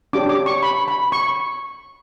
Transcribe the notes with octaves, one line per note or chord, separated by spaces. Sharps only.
D4 G4 C#5 D6
D6
C#6
B5
B5
C#6